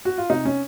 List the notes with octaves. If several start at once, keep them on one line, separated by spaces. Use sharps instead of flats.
F#4
F4
C3 D#4
C#4